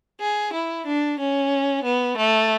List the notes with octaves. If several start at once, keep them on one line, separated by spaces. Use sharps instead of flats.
G#4
E4
D4
C#4
B3
A3